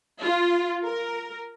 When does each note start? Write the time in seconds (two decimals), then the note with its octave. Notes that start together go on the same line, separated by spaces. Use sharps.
0.22 F4
0.84 A#4